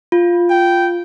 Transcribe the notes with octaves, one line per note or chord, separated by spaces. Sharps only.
F4
G5